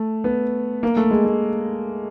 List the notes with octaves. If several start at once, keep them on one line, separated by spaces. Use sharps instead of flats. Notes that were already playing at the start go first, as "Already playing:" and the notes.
Already playing: A3
B3
A#3
A3
G#3
A3